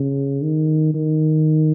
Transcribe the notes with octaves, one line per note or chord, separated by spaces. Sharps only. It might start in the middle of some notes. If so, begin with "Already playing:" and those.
Already playing: C#3
D#3
D#3